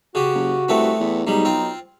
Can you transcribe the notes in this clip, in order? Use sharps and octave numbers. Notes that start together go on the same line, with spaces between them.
C#3 F#4 G4
F#1
C2 A3 B3 C4
E2
B1 G#2 G3 D#4
C4 F4